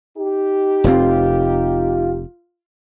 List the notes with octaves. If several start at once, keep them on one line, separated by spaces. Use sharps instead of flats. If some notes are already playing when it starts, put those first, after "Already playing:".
D#4 G4
F1 F2 C4 F4